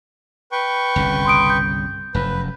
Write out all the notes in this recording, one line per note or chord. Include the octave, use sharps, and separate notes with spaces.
B4 G5 C#6
G1 C2 C#3
C6 D#6 D7
G6
F1 F#2 B4